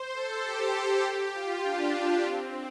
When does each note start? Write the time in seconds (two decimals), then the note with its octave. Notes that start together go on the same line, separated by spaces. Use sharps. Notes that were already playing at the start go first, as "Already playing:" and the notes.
Already playing: C5
0.13 A4
0.43 G4
0.73 G4
1.03 G4
1.34 F4
1.64 D4
1.93 D4
2.23 C4